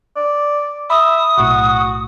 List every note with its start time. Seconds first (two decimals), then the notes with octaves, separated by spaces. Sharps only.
0.16 D5
0.90 E5 B5 D#6
1.38 B1 A2 F#4